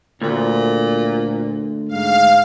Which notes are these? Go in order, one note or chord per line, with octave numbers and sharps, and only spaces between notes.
D2 A#2
G#2 F5